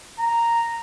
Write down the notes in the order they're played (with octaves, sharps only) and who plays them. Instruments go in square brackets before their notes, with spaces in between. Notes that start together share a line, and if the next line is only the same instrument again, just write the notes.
[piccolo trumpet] A#5